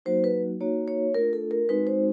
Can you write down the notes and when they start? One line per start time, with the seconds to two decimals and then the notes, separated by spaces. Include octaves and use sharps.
0.06 F#3 A#3 D#4 F#4 C5
0.24 B4
0.61 A#3 D#4 F#4 C#5
0.88 C#5
1.14 A3 D4 F4 A#4
1.33 A4
1.51 A#4
1.69 G#3 C4 D#4 F#4 B4
1.87 C5